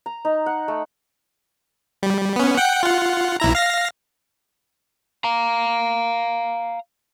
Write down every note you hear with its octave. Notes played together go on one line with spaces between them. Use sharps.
A#5
D#4
F#5
A3
G3
B3 C#4
F#5 G5
F4 F#5
B1 E4 A#5
F5 A#6
F5 A#5